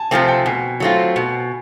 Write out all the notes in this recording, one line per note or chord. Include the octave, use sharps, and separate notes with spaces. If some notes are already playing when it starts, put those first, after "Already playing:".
Already playing: G#5 A5
C3 F3 A3 C4 G#5
G5
B2 G#5
F#3 A3 C4 F4
B2